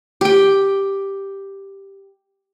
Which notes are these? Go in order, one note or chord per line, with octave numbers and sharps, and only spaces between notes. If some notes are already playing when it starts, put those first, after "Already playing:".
G4 G5